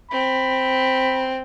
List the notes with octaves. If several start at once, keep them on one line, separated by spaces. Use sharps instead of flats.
C4 B5